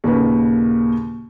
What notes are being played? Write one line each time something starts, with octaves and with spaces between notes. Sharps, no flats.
D#2 A#2 C#3 B4